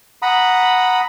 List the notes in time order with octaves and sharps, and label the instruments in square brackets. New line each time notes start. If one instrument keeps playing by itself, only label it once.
[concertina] F#5 A#5 B5 D#6